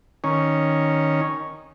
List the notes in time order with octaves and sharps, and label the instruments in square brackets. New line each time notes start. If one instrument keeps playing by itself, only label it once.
[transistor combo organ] D#3 C#4